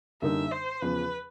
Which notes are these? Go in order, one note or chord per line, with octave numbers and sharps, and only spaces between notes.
F#2 D3 G3 A#3 D#4 E5
C5
E2 C#3 F3 B4